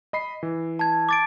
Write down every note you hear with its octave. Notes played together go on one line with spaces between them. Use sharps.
D#5 B5 C7
E3
A5 G#6
D6 A6 D7